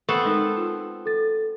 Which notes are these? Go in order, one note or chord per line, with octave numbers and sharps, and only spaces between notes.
B3 C4 A4 C#6
G#3 D#4 A#4
F4
A4 A6